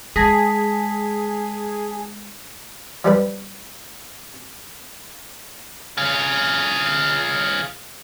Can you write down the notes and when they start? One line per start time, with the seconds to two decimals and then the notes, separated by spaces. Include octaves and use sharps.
0.16 G#3 G#4 A5 A#6 B6
3.05 F3 G3 B4
5.98 F4 G#4